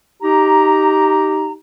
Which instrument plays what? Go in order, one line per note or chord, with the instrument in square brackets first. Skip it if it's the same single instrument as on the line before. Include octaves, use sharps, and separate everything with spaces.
[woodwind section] D#4 G4 A#5